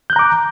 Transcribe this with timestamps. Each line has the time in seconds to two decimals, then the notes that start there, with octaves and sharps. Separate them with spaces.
0.10 G6
0.13 F#6
0.16 A#5
0.19 D6